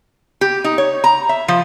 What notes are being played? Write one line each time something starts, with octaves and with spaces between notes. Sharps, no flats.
G4
D#4
C#5
A#5
E5
F3